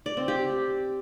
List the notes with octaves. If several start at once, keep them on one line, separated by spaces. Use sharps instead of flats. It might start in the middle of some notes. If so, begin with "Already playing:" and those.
D5
C4
G4